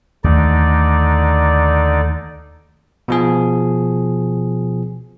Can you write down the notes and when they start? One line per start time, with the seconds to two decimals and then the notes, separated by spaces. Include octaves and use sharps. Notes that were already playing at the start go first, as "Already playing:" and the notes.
0.24 D#2 D3 A3 D#4 D5
3.08 B2 F3 G#4